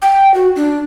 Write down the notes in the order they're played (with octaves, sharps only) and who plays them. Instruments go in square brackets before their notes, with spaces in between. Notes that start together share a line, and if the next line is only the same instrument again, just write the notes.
[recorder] G5
F#4
D4